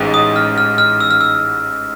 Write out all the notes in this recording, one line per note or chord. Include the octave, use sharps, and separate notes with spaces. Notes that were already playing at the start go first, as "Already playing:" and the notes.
Already playing: A1 G#2
D#6
F6
F6
F6
E6
F6
E6